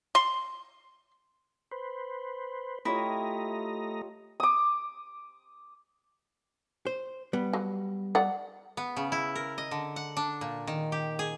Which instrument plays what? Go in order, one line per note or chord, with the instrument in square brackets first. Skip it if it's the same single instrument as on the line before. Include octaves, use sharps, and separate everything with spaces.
[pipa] C6
[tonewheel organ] B4 C5
[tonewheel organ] A3 D#5 A#5 [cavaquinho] E4 [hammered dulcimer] F4 G4 C#5
[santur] D6 D#6
[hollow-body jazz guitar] C5
G3 B3
[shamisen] F#3
D5 F#5
[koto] B3
C#3
E4
A#4
D#5
D3
F#5
D4
A#2
D#3
G4
G#4